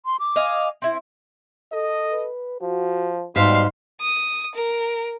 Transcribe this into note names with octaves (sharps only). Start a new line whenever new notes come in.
C6
D6
D#5 F5 G#5
C4 E4
A4 D#5
B4
F3 F#4
G#2 B2 G3 E5 F5 C6
D#6
A#4